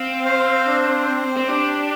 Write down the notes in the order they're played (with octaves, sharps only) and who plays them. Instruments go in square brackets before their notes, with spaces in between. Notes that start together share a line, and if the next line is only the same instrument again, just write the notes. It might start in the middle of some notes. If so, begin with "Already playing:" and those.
Already playing: [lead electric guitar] C4 [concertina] F5
[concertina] C5
D4
C5
[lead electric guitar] C4
[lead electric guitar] D4 [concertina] G4